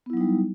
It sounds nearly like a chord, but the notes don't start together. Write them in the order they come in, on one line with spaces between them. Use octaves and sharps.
B3 E4 F#3 D#4 G3